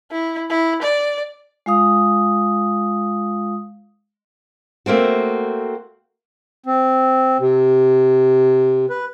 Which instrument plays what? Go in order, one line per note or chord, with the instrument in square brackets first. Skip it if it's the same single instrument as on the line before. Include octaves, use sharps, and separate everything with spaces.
[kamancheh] E4
E4
D5
[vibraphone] G#3 F4 F5 D#6
[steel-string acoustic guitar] A3 A#3 C4 F#4
[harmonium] C4
C3
B4